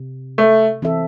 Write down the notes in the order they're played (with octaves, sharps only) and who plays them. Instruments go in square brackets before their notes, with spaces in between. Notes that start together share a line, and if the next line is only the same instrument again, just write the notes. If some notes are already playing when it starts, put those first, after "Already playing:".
Already playing: [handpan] C3
[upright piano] A3
[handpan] E3 C4 E4 A4 E5